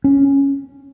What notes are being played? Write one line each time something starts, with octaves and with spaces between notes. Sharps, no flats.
C#4